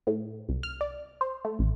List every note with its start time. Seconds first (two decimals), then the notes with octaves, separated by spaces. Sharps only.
0.07 A2
0.49 C2
0.63 F6
0.81 D5
1.21 C5
1.45 A3
1.59 A1